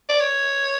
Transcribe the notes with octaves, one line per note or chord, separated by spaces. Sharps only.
D5
C#5